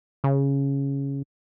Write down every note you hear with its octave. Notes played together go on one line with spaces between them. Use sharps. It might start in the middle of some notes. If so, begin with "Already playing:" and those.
C#3